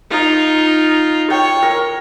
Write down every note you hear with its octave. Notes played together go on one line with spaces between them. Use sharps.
D#4 F4
C#5 G5
A#4